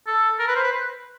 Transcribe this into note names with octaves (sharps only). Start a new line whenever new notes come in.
A4
A#4
B4
C5
B4